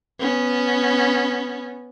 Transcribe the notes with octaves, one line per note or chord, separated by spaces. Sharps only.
B3 C#4